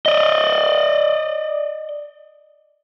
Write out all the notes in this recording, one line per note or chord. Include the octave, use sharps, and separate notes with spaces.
D5 D#5